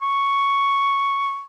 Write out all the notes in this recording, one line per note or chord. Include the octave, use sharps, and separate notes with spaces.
C#6